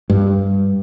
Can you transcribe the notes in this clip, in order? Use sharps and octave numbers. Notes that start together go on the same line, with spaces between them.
G2